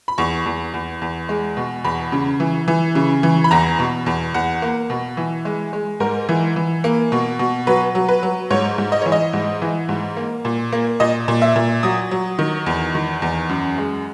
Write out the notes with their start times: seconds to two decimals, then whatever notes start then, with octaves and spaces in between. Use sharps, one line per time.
0.08 B5
0.18 E2 C#6
0.46 E2
0.74 E2
1.02 E2
1.29 G#3
1.57 B2
1.84 E2 B5
2.12 C#3
2.40 E3
2.68 E3
2.95 C#3
3.23 E3
3.44 B5
3.51 E2 A#5
3.79 B2
4.06 E2
4.34 E2 F#5
4.62 A#3
4.90 B2
5.17 E3
5.45 G#3
5.73 G#3
6.00 G#2 A#4
6.29 E3
6.56 E3
6.84 A#3
7.12 B2
7.39 B2
7.67 F#3 B4
7.95 F#3
8.09 B4
8.23 F#3
8.50 G#2 C#5
8.78 G#2
8.92 D#5
9.02 E3 C#5
9.12 D#5
9.33 G#2
9.62 E3
9.89 G#2
10.17 A#3
10.45 A#2
10.72 A#3
11.00 A#2 D#5
11.28 A#2
11.42 E5
11.56 A#2
11.83 F#3 D#6
12.11 F#3
12.39 D#3
12.66 E2
12.95 D#3
13.22 E2
13.49 F#2
13.78 G#3